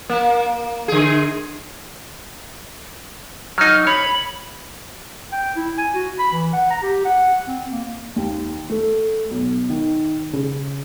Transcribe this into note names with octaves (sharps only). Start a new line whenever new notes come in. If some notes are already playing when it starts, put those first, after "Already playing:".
A#3
D3 G#4
F#3 D#4 F6
C#5 B5
G5
E4
G#5
F#4
B5
E3
F#5
A#5
G4
F#5
C4
A#3
D#2
A3
B1
D#3
C#3